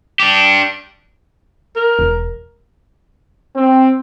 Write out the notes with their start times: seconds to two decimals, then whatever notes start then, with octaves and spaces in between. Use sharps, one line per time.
0.20 D4 G4
1.76 A#4
1.99 E1
3.56 C4